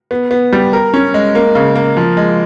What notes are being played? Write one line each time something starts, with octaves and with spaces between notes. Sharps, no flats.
B3
B3
G3
A#4
C#4
G#3
A#3
C#3
A#3
F3
G#3